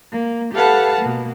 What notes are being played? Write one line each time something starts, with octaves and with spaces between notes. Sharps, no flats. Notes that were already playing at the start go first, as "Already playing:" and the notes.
A#3
G4 A4 B4 F5 F#5 A5
B2 A#3